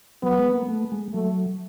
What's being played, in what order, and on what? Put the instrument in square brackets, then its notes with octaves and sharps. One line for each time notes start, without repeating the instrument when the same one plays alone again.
[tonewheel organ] F#3 [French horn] B3
[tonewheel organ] G#3
A#3
A3
G#3
[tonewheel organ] F#3 [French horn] A3